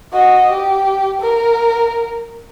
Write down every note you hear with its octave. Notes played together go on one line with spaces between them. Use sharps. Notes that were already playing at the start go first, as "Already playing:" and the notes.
F#4 D#5
G4
A#4